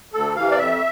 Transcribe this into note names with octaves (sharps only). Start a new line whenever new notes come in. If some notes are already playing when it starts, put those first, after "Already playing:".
D2 A4
C3 E3 F5
D5
F2 E5